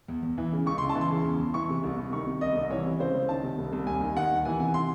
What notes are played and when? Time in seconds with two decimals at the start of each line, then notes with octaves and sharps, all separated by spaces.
0.08 E2
0.23 E2
0.38 E3
0.52 C#3
0.66 C#2 C#6
0.78 C#2 C6
0.89 A5
0.95 E3
1.01 C6
1.11 C#3
1.25 E2
1.39 E2
1.54 E3 C#6
1.69 C3
1.84 C2
1.98 C2
2.13 D#3 C#6
2.27 C3
2.41 C2 D#5
2.57 C2
2.70 E3 C#5
2.86 C3
3.00 C#2 C5
3.14 C#2
3.29 D#3 A5
3.44 C3
3.58 C2
3.73 C2
3.87 D#2 G#5
4.01 D#3
4.16 D#3 F#5
4.31 D#2
4.45 E3 G#5
4.60 C3 G#5
4.74 C6